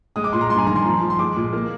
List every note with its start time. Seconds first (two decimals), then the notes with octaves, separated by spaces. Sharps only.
0.16 G#3 D#6
0.24 D6
0.33 A#2 C6
0.41 A#5
0.50 G2 C6
0.58 G#5
0.67 D#3 A#5
0.76 C6
0.85 F3
1.01 F3
1.10 C6
1.19 G#3 D6
1.36 A#2
1.53 A#3